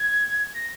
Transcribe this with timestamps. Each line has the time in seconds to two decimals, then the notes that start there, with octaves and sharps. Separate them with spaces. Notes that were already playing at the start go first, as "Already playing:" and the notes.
Already playing: G#6
0.54 A#6